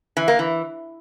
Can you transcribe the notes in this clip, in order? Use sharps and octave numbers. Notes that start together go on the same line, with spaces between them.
E3
A#3
E3